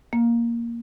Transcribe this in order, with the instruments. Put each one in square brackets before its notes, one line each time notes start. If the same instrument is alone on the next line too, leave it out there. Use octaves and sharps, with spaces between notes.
[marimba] A#3